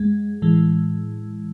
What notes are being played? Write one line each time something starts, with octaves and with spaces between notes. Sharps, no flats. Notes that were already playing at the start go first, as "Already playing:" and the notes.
Already playing: F#2 G#3
A2 E3 G#3